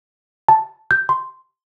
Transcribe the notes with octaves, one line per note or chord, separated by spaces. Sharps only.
A5
G6
C6